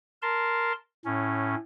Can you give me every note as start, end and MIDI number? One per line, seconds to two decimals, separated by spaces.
0.22 0.72 70
0.22 0.72 81
0.22 0.72 84
1.05 1.55 45
1.05 1.55 61